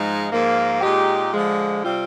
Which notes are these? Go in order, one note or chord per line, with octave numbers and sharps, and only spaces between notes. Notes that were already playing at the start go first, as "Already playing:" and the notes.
Already playing: G#2 F3 G#3 D#4
G#2 F3 A#3
A#2 G#3 D#4 G4
D3 F3 G#3
C3 G3 C4 F4